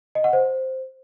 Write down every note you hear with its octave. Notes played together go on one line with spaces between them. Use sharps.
D#5
F#5
C5